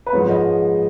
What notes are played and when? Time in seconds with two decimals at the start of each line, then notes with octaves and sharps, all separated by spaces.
0.06 B4
0.13 G#2 F3 G#3 B3 C#5
0.29 D#5